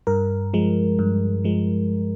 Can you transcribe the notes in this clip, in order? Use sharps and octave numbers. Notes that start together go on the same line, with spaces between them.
G2 A#4
F3 G#3
G2
F3 G#3